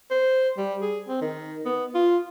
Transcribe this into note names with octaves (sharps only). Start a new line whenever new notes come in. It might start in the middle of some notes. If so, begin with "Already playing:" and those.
C5
G3
G#4
C4
D#3
B3
F4